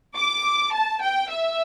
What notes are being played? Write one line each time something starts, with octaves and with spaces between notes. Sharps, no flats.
D6
A5
G5
E5